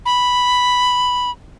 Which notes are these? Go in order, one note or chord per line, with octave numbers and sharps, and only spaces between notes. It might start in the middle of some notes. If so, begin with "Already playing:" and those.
B5